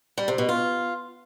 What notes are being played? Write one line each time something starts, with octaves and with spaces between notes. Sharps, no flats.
G3
C3
B2
F4